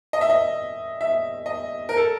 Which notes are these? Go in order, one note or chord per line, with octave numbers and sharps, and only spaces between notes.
D#5
E5
D#5
E5
D#5
A#4
A4